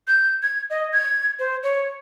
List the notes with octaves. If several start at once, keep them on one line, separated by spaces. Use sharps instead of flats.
G6
G#6
D#5
G#6
C5
C#5